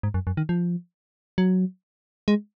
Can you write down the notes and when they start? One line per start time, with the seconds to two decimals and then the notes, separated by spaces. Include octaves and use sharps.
0.03 G#2
0.14 F#2
0.27 F#2
0.37 D#3
0.49 F3
1.38 F#3
2.28 G#3